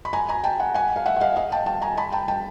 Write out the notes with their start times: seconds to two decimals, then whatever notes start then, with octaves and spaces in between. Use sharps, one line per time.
0.05 B5
0.13 G#5 A#5
0.29 G#5 A#5
0.44 G5 A5
0.60 F#5 G#5
0.74 F#5 G#5
0.96 F5
1.06 E5 F#5
1.16 F#5
1.20 D#5 F5
1.36 D#5 F5
1.52 G5 A5
1.66 G5 A5
1.82 G#5 A#5
1.97 A5 B5
2.12 G5 A5
2.28 G5 A5